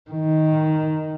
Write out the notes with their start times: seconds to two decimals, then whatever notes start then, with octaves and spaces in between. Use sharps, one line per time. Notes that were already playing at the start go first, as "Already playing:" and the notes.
0.10 D#3